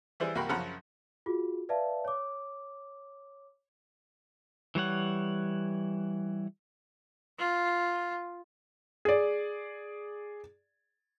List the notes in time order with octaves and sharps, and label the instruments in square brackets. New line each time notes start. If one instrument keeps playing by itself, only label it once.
[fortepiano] E3 G3 E4 G#4 C5 D5
C2 A#3 F#4 G5 B5
F#2 C#3 F3 F#5 A#5 B5
[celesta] F4 F#4 G#4
B4 D5 E5 F5 A5
C#5 D6
[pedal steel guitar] E3 G3 C#5 F#5
[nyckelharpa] F4
[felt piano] G#4 D5